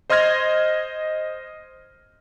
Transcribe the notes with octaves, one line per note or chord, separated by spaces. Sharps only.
C5 D#5 C6 F6 G#6 A#6